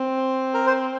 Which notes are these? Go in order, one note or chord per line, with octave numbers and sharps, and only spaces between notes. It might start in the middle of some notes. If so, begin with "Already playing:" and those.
Already playing: C4
A#4
C5